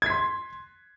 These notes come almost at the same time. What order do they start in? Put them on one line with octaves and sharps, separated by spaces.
G#6 B6 C6